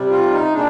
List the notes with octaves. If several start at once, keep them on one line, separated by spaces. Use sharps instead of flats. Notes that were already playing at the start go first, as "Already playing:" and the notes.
Already playing: C3 G3
F4
D#4
A#2 G#3 D4